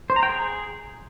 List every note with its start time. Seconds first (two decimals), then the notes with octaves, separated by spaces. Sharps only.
0.10 C5
0.16 A#5
0.23 G5
0.29 G#4